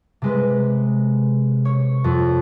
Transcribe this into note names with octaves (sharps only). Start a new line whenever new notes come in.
C3 G#3 B4
C#5
F2